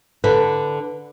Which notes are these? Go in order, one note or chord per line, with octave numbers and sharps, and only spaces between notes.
D3 A4 B4